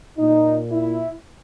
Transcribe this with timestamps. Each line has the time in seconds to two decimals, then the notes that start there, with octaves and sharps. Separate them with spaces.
0.19 A#2 D#4
0.71 E4